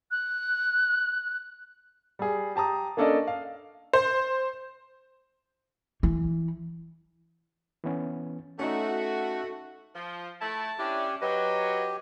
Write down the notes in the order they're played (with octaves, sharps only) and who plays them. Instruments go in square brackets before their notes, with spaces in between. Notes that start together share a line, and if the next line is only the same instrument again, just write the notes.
[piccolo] F#6
[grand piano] G3 G#4
G4 A5 A#5 D#6
A#3 C#4 D4 A4 D5 D#5
F5
[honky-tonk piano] C5
[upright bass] E3
[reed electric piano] E3 B3 C#4
[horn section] A3 F#4 [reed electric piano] C#4 D#4
[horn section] F3
[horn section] A3 E4 [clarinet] A5
[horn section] C#4 D4 [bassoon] E4 [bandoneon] G4
[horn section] F#3 [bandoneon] G4 [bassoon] B4 [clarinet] D#5